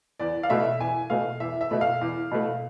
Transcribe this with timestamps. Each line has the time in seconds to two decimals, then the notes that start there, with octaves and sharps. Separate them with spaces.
0.19 E2 D5
0.43 F5
0.50 B2 A3 E5
0.80 E2 G#5
1.10 B2 A3 F5
1.40 E2 E5
1.61 E5
1.71 B2 A3
1.81 F5
2.01 E2
2.31 B2 A3